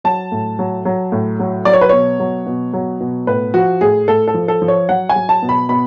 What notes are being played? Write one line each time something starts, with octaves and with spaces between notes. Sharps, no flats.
F#3 A5
A2
F#3
F#3
A2
F#3
F#3 D5
C#5
B4
B2 C#5
F#3
B2
F#3
B2
A2 B4
F3 F#4
A2 G#4
A2 A4
A4
F3
A4
F3
C#5
F#3 F#5
G#5
F#3
A5
B2
B5
B2 B5